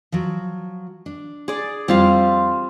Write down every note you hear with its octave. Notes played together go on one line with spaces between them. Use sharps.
F3 F#3
D4
G#4 D5
F2 G3 C4 F4 F5 A#5